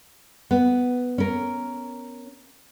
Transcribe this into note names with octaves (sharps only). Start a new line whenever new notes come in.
B3
C#4 A#4